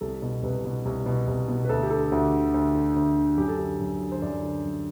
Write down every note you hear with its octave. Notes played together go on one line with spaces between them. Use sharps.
C2 A4
B2
C2 B4
B2
C2
B2
C2
B2
B4
D2 A4
G4
D3 A4
D2 F#4
D3
D2
D3
D2
D3
F#2 G4
A4
D3 G4
F#2
D3
C5
F#2 D5
D3
F#2